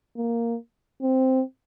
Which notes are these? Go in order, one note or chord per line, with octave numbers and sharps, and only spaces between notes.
A#3
C4